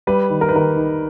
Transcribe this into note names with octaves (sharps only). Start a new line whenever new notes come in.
G3 B4
D#3
A#4
B4
D#3 A#4
D#4